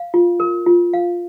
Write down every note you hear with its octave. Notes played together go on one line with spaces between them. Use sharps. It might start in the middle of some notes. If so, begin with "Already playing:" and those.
Already playing: F5
F4
A#4
F4
F5